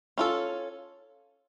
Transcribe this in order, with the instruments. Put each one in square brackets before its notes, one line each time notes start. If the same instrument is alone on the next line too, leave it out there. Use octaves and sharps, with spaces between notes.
[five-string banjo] C#4 F4 A4